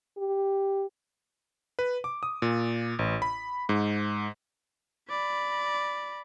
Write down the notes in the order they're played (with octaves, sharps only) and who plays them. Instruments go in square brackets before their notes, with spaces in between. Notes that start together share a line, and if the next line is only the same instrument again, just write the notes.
[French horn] G4
[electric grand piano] B4
D6
D#6
A#2
A1
B5
G#2
[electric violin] D5 B5